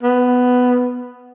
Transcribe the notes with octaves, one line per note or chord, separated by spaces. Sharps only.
B3